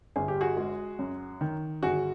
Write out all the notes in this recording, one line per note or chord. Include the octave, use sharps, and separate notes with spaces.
G1 G#4
G4
F#4 G#4
G#3
F#2
D#3
G1 F#4 G#4